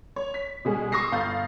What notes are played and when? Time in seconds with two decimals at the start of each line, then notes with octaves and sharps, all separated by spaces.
0.16 C#5
0.34 B6
0.65 B2 G3 G#3 G#4
0.92 C6 C#6 D#6 E6 A#6 C7
1.12 G1 F5 G6 A6